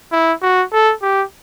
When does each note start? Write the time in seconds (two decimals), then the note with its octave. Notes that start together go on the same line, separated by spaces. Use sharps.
0.12 E4
0.42 F#4
0.72 A4
1.02 G4